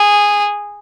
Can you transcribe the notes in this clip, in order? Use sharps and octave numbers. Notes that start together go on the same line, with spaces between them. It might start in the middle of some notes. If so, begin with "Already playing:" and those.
Already playing: G#4